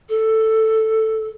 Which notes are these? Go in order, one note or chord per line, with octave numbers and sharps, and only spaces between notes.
A4